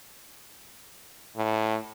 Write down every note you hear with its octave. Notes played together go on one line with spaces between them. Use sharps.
A2